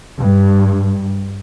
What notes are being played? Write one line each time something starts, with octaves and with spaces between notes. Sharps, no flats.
G2